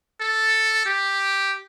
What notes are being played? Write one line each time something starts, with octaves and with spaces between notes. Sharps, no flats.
A4
G4